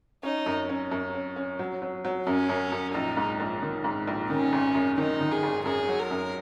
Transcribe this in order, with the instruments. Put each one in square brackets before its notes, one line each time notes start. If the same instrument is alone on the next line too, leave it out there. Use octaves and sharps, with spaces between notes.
[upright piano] C#4 [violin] D#4
[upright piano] F#2
C#4
F#2
C#4
C#4
F#3
F#3
F#3
[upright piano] F#2 [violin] C#4
[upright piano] F#2
F#2
[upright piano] A#1 [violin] D#4
[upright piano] G#2
A#1
D#3
G#2
A#1
[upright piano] D#3 [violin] C#4
[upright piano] G#1
F#2
[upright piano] D#3 [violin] D#4
[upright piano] D#3
[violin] G#4
[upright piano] G#1
[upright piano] F#2 [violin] G#4
[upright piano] F#3
[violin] A#4
[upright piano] F#2